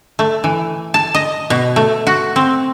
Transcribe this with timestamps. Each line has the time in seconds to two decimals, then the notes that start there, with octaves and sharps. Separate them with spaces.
0.19 A3
0.44 E3
0.94 A5
1.15 D#5
1.50 B2
1.76 A3
2.07 F#4
2.36 C4